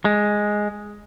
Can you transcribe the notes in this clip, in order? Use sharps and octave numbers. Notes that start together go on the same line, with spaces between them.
G#3